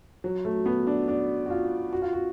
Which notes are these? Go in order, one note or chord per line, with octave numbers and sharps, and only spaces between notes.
F#3
A3
B3
D4
D4
F#4
F4
F#4
F4
F#4